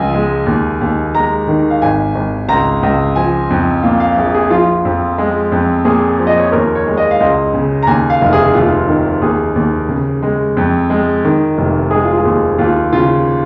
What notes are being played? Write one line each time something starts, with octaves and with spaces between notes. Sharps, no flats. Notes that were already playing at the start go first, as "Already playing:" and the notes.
Already playing: C#2 F3 G#5
G#3
D#2
D#2
G#3 A#5
D#3
F5
G#1 G#5
G#1
C#2 A#5
C#2
F3 G#5
F2
A#2 F5
F5
A#1 G#4
G#4
F3 F4
F2
G#3
F2
A#2 G#4
F3
D#5
C#5
D#2 A#4
C#5
G#3
D#5
F5
C#2 D#5
C#3
A#5
D#2 G#5
F5
F1
G#4
D#2 F4
D#3
D#2 G#4
D#2
C#3
G#3
F2
G#3
D#3
F1
G#3 G#4
F4
G#4
D#2
D#2 F4
C#3 F4